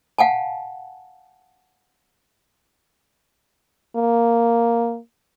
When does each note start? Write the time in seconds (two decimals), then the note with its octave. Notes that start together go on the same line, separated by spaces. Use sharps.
0.18 F5 F#5 G#5 A5
3.96 A#3